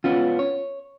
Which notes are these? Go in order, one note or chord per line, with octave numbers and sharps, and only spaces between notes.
B3 C#4 F4
C#5